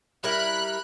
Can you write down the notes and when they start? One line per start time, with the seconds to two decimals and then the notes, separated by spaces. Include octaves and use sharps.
0.24 G3 E4 A#4 B5 F#6